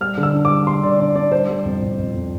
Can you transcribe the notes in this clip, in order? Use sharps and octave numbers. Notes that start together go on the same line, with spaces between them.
G3 F6
D3
E6
D4
D6
G3
G3 C6
D3 D5
D4 D5
D4 D5
G3 C5
G3
F2
F2
F2
F2